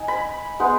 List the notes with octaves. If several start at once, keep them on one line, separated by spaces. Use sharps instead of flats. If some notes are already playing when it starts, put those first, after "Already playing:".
Already playing: D#4 G#5
B5
G#3 B3 D#4